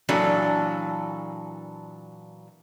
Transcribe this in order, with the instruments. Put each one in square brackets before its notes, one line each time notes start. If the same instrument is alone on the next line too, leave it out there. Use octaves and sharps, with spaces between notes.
[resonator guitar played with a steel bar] A#2 E3 F#3 D4 A4